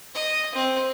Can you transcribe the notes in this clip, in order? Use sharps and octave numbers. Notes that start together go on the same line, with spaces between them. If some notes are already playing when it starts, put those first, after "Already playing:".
D#5
C4